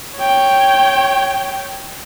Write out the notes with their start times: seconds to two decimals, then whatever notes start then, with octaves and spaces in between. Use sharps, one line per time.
0.18 C#5 G5